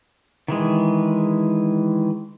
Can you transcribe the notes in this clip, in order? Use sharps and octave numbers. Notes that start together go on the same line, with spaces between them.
D#3 E3 G#3